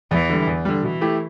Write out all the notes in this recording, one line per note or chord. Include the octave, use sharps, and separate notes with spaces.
E2 E3
D3 G3
E2
D3 G3
B2 E3
A3 E4 G4